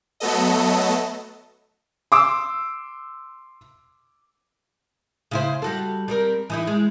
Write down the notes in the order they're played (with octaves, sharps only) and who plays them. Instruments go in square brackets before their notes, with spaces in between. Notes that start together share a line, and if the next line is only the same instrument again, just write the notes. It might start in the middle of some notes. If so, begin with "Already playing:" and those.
[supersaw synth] F#3 A3 B3 A4 D#5
[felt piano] C6 D6 E6
[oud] C#3 E4 C5
G3 F#4 A4
G3 C4 A#4
E3 D#4 E4
G#3